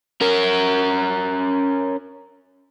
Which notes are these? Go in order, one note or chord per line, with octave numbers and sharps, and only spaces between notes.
C#4 A#4